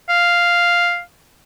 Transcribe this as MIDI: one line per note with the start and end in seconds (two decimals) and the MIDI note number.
0.09 1.01 77